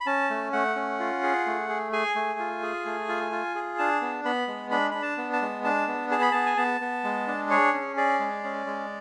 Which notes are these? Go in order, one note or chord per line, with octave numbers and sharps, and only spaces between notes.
B5
C#4 A5
A3
A3 F#5
C#4
F4
G#4
A3
G#4
G#4 G#5
A3
F4
G#4
A3
F4
F4
G#4
D4 A5
B3
B3 B5
G#3
D4 B5
D4 B5
A5
B3
A5
G#3
D4 A5
B3
G#4 A5
B5
B3 A5
G#5
B3 A5
B3
G#3
D4
G#4 C#5
C#4
G#4 D5
G#3
C#4
G#3